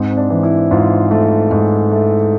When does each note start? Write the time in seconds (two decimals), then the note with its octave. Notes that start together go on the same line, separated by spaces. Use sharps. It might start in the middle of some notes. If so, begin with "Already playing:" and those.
Already playing: G#2 C4
0.11 C4
0.17 D4
0.30 E3
0.43 E4
0.71 G#2 F4
1.11 A3
1.51 G#2
1.91 A3